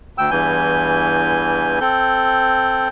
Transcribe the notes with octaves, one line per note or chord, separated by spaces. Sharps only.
D2 G5 E6
E2 G2 E3 G#5 G6
C4 A4 G6